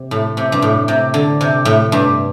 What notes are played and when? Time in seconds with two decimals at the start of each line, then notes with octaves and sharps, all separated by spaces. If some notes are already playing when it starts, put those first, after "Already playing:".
Already playing: C3
0.11 A2
0.37 C3
0.52 G2
0.62 A2
0.88 C3
1.14 D3
1.41 C3
1.65 A2
1.92 G2